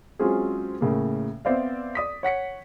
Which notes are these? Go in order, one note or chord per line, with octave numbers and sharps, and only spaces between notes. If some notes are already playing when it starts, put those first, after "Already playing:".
F#3 G#3 C4 C#4 F4 G#4
A2 C#3 A#3
B3 C4 C5 D5 E5 F5
D5 D#6 B6
C#5 F#5 B6 C#7